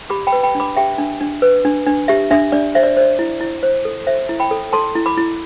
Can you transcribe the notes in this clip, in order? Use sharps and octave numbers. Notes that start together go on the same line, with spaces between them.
G4 B5 D6
G5 B5
B4
G5 B5
D4
B5 D6
G4 E5 G5
D4
D4
B4
D4
D4
G4 E5
D4 E5
D4 D5
C5 E5
D5
C5 D5
E4
E4
C5
A4
C5 E5
E4
G5 B5
A4
A4 A5 C6
E4
B5 D6
E4